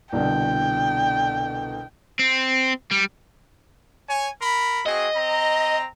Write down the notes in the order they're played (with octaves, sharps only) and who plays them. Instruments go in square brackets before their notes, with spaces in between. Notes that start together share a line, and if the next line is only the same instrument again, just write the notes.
[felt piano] C2 B2 D3 [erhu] G5
[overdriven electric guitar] C4
G3
[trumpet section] C#5 G#5
A#4 B5
[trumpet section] C4 F#4 G#4 [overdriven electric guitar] D#5
[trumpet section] C4 A#5